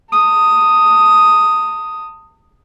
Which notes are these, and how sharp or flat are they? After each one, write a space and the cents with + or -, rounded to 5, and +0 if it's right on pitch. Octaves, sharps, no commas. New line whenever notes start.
A5 +40 D#6 +0